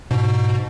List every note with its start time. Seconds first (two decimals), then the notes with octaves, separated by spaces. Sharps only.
0.11 G#2 B2